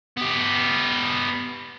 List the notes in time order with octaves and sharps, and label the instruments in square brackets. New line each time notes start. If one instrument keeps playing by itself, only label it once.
[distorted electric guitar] B3 G4